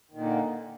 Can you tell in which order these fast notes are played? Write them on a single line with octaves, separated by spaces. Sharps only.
D#3 A#2 D3 A#3